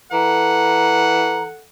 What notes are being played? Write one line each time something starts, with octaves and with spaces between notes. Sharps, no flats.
E3 A4 F#5 A#5